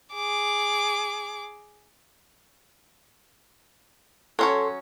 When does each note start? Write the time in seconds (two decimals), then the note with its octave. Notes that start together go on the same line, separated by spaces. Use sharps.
0.14 G#4 D6
4.39 F#3 C#4 A4 C#5 C6 C#6